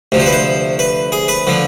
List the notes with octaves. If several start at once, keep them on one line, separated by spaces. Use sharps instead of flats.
D2 C3 F3
C5
B4
C5
B4
G#4
B4
D3 F3